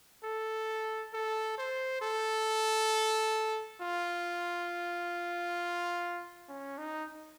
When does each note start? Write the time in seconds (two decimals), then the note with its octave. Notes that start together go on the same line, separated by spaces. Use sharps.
0.24 A4
1.14 A4
1.58 C5
2.02 A4
3.81 F4
6.49 C#4
6.78 D#4